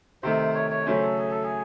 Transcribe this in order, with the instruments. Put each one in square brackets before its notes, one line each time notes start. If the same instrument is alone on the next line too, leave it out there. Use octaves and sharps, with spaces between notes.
[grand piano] C3 D#3 A3 [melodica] C5
[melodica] C#5
C#5
[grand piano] C#3 F#3 A3 C#4 [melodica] C5
[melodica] A4
G#4
A4
G#4